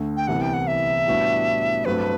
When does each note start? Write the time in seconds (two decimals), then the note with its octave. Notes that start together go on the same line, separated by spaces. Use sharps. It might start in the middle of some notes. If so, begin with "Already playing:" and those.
Already playing: D2 D3 A3
0.17 G5
0.27 C2 C3 E3 B3 F#5
0.41 G5
0.54 F#5
0.67 E5
1.06 A2 G3 B3 D4 F#4
1.85 G2 F#3 A3 C4 B4